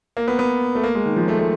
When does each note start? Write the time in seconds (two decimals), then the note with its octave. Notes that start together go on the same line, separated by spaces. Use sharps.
0.17 A#3
0.28 B3
0.39 B3
0.75 A3
0.83 A#3
0.95 G#3
1.05 D#3
1.16 F3
1.28 A3
1.39 A3